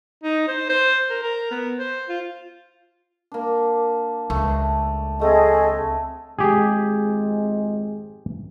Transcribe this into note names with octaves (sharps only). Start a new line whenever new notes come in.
D#4
C5
C5
A#4
A#4
B3
C5
F4
A#3 D4
C#2 A3
F#3 A3 C4 G#4 A4 D#5
G#1 F2 G#3 G4 G#4